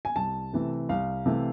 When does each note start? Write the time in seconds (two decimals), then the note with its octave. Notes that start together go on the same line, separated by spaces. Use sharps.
0.05 G#5
0.16 C2 A5
0.53 C3 E3 A3
0.89 C2 F5
1.26 C3 E3 A3